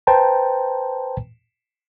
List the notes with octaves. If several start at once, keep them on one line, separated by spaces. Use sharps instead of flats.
B4 C5 G5 A5 A#5